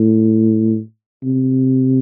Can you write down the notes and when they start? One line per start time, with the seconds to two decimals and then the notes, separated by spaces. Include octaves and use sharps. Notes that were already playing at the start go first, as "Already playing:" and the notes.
Already playing: A2
1.23 C3